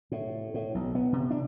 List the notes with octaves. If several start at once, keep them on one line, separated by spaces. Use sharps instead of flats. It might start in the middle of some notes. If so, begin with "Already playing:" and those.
A2
A2
B1
B3
C3
D4